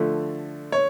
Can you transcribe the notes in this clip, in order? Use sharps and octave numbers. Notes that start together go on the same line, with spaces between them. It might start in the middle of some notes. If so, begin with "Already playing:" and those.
Already playing: D3 F3 A3
C#5